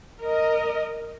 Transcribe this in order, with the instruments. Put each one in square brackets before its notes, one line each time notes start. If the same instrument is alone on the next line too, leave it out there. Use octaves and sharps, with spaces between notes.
[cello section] A#4 D#5